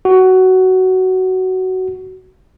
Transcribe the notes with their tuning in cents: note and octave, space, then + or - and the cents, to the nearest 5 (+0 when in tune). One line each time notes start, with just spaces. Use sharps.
F#4 +15